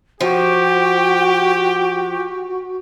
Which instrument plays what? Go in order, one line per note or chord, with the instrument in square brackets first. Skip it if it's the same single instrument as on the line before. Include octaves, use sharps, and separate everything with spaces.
[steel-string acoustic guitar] F3 [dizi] F#4 [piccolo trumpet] G4 [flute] G5